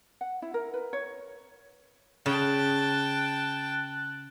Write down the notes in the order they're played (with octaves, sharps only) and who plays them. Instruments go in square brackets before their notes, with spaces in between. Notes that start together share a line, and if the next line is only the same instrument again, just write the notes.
[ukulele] F#5
E4
A#4
B4
C#5
[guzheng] C#3 [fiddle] G5 A5 [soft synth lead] F#6